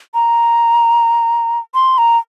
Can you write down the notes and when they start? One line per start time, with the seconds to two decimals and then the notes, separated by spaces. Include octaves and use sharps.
0.14 A#5
1.75 C6
1.98 A#5